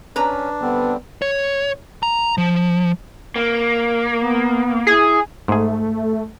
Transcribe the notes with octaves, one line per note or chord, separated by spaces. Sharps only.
C#4 D4 B4 A#5
D3 G3 B3 C4
C#5
A#5
F3
A#3
B3
E4 G#4
G#2 A3 G#4